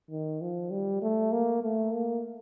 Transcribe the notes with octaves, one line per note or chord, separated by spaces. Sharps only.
D#3
F3
G3
A3
A#3
A3
A#3